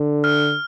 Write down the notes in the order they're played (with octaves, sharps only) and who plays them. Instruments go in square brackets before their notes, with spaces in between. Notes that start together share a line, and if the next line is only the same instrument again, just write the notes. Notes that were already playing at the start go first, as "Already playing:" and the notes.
Already playing: [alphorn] D3
[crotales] F6